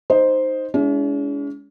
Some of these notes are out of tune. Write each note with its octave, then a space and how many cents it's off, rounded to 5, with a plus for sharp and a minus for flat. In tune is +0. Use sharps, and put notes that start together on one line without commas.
D#4 +0 C5 +0 D#5 +0
G#3 +0 C#4 +45 E4 +0